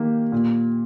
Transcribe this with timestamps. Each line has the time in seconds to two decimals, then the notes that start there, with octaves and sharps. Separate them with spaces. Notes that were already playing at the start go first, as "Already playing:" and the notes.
Already playing: D#3 A#3 G4
0.32 A#2